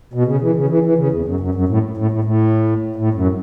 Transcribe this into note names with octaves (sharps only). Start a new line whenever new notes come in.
B2
C#3
E3
C#3
E3
E3
C#3
E2
F#2
F#2
F#2
A2
A2
A2
A2
A2
F#2